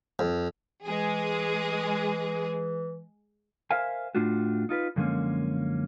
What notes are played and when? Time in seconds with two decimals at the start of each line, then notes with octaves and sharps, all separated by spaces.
0.19 F2
0.83 E3 G#3 G#4
3.71 A#4 C5 E5 F5 G#5
4.15 A2 A3 D4 F4 F#4
4.69 D#4 F4 A#4 B4
4.96 F#2 D3 F3 G#3 A#3 C#4